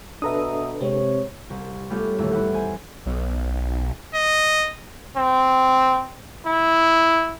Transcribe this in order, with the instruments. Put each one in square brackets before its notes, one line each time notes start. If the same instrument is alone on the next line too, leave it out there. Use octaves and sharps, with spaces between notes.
[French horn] B2 [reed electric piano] D4 A4 B4 [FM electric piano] E5 A#5 D#6
[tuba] C3 [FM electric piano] G#3 C4 [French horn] C#5
[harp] C2
G3 A3 B3 C#4 F4 G4
D#1 A1 E2 A3 E6
E4 F#5
B4 C5 G#5
[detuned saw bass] B1
[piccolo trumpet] D#5
[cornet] C4
E4